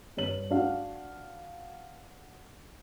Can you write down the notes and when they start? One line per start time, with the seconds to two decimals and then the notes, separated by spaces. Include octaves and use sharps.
0.17 G2 C#5 F#7
0.50 D4 F#4 F5 F#5